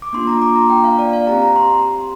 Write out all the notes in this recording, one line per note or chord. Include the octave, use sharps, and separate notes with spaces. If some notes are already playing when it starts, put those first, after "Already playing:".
D6
A#3 D4 F4 C6
A#5
D6
A#5
G5
F5
D5
F5
C4 G4 A#5
A#5
C6
C6